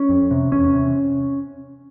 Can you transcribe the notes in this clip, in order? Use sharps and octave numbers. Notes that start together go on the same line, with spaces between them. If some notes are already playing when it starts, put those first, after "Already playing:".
Already playing: C#4
F2
C3
E2 C#4
C3